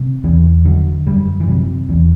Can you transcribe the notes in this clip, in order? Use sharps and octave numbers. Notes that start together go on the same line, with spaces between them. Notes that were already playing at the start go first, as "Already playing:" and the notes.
Already playing: C3
E2 E3
D3 F#3
F#2 G3
E3
C3 F#3
E2 E3